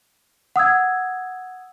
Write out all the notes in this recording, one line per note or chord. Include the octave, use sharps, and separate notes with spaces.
F#5 D#6 E6 G#6